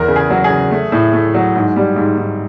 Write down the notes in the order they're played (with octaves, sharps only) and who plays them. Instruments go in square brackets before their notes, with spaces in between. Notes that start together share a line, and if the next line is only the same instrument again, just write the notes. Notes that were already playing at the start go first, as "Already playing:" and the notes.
Already playing: [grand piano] E2 A#4
C#3
G#4
F#3
G#4
C#3
A3
A2
A3
F#3
G#2
G3
G#2
G#2